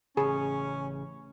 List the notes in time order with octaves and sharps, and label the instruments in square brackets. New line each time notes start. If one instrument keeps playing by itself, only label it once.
[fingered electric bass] A1 C#3 [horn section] C#4 [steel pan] G#4